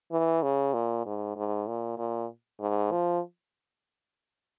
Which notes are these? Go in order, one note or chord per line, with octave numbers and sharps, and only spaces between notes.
E3
C#3
A#2
G#2
G#2
A#2
A#2
G#2
F3